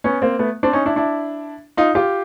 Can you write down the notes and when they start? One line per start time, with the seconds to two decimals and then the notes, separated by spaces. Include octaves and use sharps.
0.04 B3 C#4
0.22 A#3 C4
0.39 A3 B3
0.63 C4 D4
0.73 C#4 D#4
0.86 D4 E4
0.96 D4 E4
1.77 D#4 F4
1.95 F4 G4